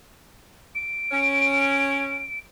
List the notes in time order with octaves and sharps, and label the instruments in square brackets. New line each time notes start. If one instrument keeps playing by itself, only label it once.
[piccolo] D7
[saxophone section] C#4